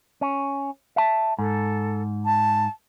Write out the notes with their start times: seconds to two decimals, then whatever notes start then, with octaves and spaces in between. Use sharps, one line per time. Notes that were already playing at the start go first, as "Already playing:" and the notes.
0.21 C#4
0.96 E5 A5
1.39 G#2 A4
2.25 A5